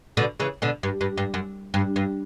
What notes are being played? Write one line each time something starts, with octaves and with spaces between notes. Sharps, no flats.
B2 D3
C#3 E3
B2 D3
G2
G2
G2
F#2
G2
G2